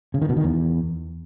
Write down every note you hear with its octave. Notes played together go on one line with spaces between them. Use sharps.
C#3
D#3
B2
D#3
E2